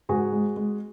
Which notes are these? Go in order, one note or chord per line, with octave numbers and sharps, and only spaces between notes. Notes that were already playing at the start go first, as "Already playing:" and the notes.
G#2 F#4 G#4
G#3
G#3